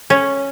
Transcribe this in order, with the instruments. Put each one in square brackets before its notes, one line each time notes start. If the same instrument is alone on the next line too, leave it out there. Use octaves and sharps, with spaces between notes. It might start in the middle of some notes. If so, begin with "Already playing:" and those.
[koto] C#4